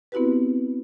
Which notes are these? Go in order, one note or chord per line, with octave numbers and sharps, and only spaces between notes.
B3 C4 E4 F#4 G4 B4